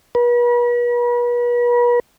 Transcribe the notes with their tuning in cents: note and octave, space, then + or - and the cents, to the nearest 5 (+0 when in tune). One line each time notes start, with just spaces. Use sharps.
B4 -40